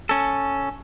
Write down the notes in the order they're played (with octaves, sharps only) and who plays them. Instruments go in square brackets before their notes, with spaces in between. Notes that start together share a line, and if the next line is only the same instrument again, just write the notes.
[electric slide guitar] C#4 A4